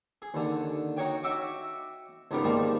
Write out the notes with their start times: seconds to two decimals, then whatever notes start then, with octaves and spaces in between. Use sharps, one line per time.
0.22 G#4
0.34 D#2 D3
0.97 D#4 F#4 C#5 G5
1.23 F#4 D#5 E5 G5 C#6 D6
2.31 C#2 G#2 B3 G4 A#4 G5
2.44 G#2 D#3 F3 G3 A#3